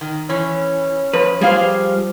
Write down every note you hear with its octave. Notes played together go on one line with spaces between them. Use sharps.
D#3
E3 C#4
F3 B4
F3 G3 G#4 C5 F5